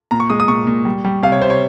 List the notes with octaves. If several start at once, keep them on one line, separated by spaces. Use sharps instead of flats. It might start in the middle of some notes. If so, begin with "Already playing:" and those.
A#2 A#5
C#6
G#3 D#6
D#6
A#2 C#6
A#2
G3
G3
C3 F5
C#5
C3 C5
C#5